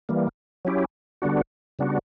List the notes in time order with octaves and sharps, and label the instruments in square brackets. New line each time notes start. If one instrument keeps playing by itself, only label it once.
[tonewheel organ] E3 G3 A#3
F#3 C#4 E4 G4
D3 G3 B3 D4 F#4
C#3 G3 B3 D4 F#4